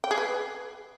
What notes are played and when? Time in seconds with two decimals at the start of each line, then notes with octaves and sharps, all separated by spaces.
0.04 G5
0.11 G#4
0.18 B4